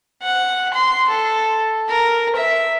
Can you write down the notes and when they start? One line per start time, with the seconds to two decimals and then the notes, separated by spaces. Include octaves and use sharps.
0.22 F#5
0.74 C6
1.09 A4
1.89 A#4
2.36 E5